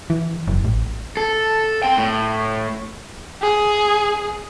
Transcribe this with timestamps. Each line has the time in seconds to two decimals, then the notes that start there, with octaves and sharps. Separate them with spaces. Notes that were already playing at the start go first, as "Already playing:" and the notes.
0.10 E3
0.48 F#1
0.65 A1
1.17 A4
1.83 C4 G5
1.98 A2
3.42 G#4